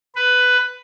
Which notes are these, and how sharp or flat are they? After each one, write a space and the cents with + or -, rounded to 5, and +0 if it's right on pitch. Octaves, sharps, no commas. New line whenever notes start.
B4 +10